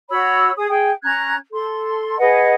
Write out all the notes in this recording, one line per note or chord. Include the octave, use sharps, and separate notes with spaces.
F#4 C#5 B5 E6
G#4 D#6
G#4 G5
C#4 A#5 F#6 G#6
A4 C6
G#4 B4 D#5 F#5